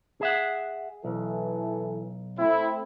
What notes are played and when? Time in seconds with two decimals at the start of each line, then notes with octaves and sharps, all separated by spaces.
0.21 G#4 E5 F#5
1.05 B1 E3 A4
2.39 A3 C4 E4